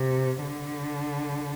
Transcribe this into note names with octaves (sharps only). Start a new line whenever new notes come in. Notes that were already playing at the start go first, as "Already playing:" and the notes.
Already playing: C3
D3